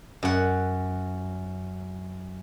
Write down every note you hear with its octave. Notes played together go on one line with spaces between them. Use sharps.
F#2 F#5